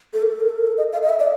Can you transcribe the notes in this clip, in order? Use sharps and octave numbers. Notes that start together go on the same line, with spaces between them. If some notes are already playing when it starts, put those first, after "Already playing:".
A4
A#4
A4
A#4
A4
A#4
A4
D#5
F5
D#5
E5
D5